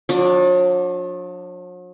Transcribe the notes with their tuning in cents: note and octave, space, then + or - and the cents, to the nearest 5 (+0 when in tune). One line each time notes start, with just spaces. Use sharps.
F#3 -45 D4 +0